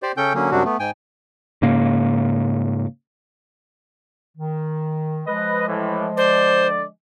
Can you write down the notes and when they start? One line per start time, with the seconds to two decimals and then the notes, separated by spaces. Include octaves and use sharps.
0.03 G4 C5 D5
0.17 C#3 C#4 A4 G5 G6
0.34 D3 F#3 A#3 C#4
0.51 F#2 C3 F#3 G3 D4 F#4
0.65 A3 B3
0.79 G#2 G5 G#5
1.62 G#2 C#3 A#3
4.37 D#3
5.27 F3 G#3 B4 D#5
5.68 A2 E3
6.17 D3 C5 D5